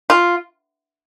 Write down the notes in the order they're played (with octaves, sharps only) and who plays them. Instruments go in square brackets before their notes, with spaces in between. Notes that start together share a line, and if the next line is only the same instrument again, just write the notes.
[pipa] F4